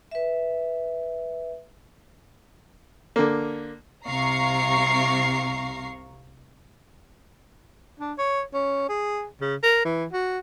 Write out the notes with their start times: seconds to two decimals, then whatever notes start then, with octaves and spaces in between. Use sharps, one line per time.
0.11 B4 E5
3.16 D3 A#3
4.07 C2 C3 F5 A#5 C#6 C7
7.99 D4
8.18 C#5
8.54 C#4
8.89 G#4
9.41 C#3
9.63 A#4
9.85 E3
10.12 F#4